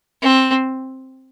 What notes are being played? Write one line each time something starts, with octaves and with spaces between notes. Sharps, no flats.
C4